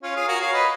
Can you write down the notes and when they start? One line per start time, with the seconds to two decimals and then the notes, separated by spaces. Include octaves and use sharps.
0.03 C#4 F4
0.15 F4 G#4
0.28 F#4 A#4
0.41 C#5 F5
0.53 B4 D#5